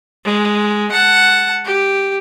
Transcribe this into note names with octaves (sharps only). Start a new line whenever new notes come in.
G#3
F#5 A5
G4